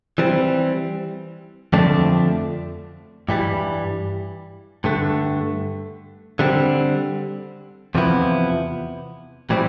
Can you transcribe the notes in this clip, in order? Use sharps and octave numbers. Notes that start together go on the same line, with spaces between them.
E3 G3 C4
F2 D3 F3 A3 D4
G2 E3 G3
G2 D3 A3
D3 G3 C4
E2 C3 F3 B3 E4
A2 E3 G3 C4